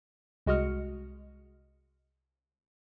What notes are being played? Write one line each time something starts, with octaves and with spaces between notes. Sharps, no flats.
C2 G#3 F#4 D#5 F6 C#7